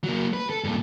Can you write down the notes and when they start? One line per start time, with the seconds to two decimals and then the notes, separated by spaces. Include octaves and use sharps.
0.04 F#3 A#3
0.33 B4
0.50 A4
0.64 G2 A#2